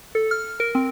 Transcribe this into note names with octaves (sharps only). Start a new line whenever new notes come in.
A4
F6
A#4
C4